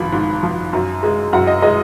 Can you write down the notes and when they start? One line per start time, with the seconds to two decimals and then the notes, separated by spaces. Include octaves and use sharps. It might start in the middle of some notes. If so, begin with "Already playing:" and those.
Already playing: G#1 F3 B5
0.12 G#2
0.43 F3
0.73 F#2
1.03 G#3
1.33 F#2 F#5
1.47 D#5
1.62 G#3 D#5